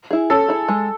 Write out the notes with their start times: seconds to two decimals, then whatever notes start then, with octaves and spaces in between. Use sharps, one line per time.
0.11 E4 G#4
0.30 C#4 A4
0.48 E4 G#4
0.69 G#3